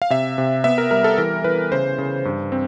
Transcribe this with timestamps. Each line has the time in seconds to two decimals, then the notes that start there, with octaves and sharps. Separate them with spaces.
0.02 F5
0.10 C3 E5
0.38 C3
0.64 B3 E5
0.78 A#4
0.91 G3 A#4
1.04 A4
1.18 E3 A#4
1.44 E3 B4
1.72 C#3 C5
1.98 C#3
2.25 G2
2.52 C4